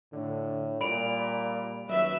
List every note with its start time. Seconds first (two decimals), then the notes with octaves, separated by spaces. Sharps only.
0.13 A2 D3
0.81 A#2 G3 B5 D7 F7
1.87 D#1 F#3 B4 E5